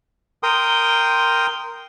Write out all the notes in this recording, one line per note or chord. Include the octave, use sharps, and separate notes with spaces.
A#4 G5 C6 D#6